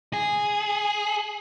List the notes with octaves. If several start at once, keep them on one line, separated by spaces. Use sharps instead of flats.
G#4